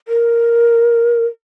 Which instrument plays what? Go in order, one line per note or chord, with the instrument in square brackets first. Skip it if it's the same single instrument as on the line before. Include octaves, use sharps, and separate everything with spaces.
[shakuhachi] A#4